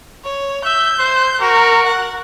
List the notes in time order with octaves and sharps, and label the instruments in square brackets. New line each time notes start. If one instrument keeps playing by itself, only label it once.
[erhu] C#5
[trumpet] E5 [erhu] G6
[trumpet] C5
[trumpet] F#4 [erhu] A#4
[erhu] F#5